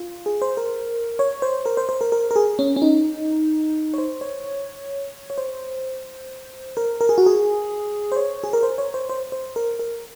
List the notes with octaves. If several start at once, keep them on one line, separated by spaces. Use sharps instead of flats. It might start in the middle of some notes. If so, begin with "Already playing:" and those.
Already playing: F4
G#4
C5
A#4
C#5
C5
A#4
C5
C5
A#4
A#4
A#4
G#4
C#4
C#4
D#4
C#5
C5
C#5
C#5
C5
A#4
A#4
G#4
F#4
G#4
C5
C#5
G#4
A#4
C5
C#5
C5
C5
C5
A#4
A#4